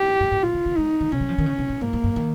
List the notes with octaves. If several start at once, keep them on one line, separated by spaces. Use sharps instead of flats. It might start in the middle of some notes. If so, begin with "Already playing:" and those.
Already playing: G4
F2
G2
G#2
A#2 F4
C#3
C#3
G#3 D#4
D#3
C3 C#4
G3
F3
D#3
C#3
C3
A#2
G#2 A#3
G#2
G2
D#3